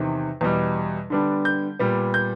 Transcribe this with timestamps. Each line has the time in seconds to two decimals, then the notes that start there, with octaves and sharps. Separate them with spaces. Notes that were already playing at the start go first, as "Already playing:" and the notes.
Already playing: E2 C3 D#3
0.41 E2 B2 G3
1.10 D3 G3 B3 D4
1.45 G6
1.79 A#2 G3 B3
2.14 G6